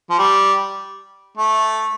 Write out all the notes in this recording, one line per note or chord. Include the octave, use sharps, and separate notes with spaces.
F3
G3
A3